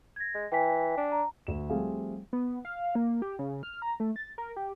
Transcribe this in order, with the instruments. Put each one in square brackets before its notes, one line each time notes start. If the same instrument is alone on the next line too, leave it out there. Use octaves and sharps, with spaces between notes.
[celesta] G#6 A#6
[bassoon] G#3
[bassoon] E3 [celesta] G5 G#5 B6
[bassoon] D4
[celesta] A#5
[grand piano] D2 E7
F3 G3 A3 C4 G#4 F5
[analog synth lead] B3
F5
A#3
G4
C#3
F6
A#5
A3
A6
A#4
G4